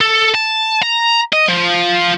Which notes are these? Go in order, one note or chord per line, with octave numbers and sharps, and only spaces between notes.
A4
A5
A#5
D#5
F3